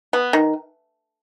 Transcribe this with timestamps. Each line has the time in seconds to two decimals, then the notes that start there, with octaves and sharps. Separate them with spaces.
0.13 B3
0.33 D#3